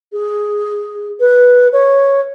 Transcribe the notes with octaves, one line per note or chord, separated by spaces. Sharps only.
G#4
B4
C#5